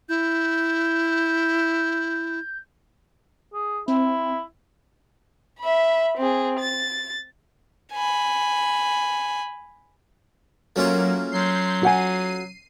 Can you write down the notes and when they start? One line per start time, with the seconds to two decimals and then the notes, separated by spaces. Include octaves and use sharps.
0.09 E4 G6
3.53 G#4
3.88 C4 E4
5.60 E5 B5
6.17 C4 G#4
6.59 A6
7.93 G#5 B5
10.76 F#3 A3 A#3 C#4 F4
11.32 F#3 C6 G6 C7
11.83 F#4 F#5 G#5 C7 D#7